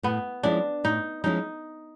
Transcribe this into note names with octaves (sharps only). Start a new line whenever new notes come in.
A2 B3
F3 G#3 C#4 D4 E4
A2 D#4
F3 G#3 C#4 D#4 E4